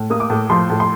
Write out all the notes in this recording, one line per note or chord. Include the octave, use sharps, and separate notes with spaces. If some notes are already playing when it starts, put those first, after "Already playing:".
Already playing: A2
A#3 D#6
D6
A2
F3 C6
A2
C6